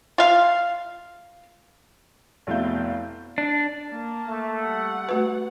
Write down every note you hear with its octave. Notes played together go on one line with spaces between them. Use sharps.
F4 F5
F1 B2 A3 E4 F5 G6
D4
A#3 A5
A3
G3 F#5
A3 F#4 B4